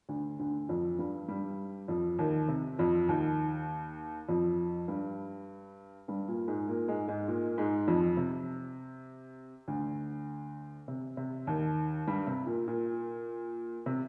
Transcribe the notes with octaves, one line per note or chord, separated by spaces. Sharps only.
D2 D3
D2 D3
F2 F3
G2 G3
G2 G3
F2 F3
D#2 D#3
C3
F2 F3
D#2 D#3
F2 F3
G2 G3
G2 G3
A#2 A#3
G#2 G#3
A#2 A#3
G#2 G#3
G#2 G#3
A#2 A#3
G#2 G#3
F2 F3
C3
D2 D3
C3
C3
D#2 D#3
G2 G3
C3
A#2
A#2
C3